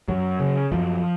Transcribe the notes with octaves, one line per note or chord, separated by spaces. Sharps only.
F#2 F#3
C#3
F#2 F3